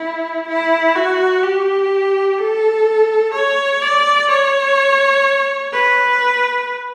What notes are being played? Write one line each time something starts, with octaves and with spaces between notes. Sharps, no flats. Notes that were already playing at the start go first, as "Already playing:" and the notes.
Already playing: E4
E4
F#4
G4
A4
C#5
D5
C#5
B4